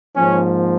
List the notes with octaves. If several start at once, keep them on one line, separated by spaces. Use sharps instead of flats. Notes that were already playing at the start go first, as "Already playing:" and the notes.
G#2 F3 A#3 C#4